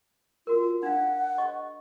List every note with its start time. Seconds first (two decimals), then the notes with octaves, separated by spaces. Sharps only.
0.47 F4 F#4 A#4
0.83 D4 F5 F#5
1.38 D#5 C#6